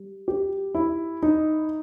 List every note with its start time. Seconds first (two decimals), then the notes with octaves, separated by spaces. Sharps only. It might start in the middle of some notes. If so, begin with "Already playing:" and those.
Already playing: G3
0.28 G4
0.75 E4
1.23 D#4